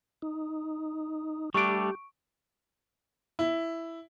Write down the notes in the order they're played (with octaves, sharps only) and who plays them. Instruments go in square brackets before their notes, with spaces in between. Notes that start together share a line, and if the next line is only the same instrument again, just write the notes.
[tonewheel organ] D#4
[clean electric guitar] G3 A3 D4 [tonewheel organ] G4 [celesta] C#6 D7
[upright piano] E4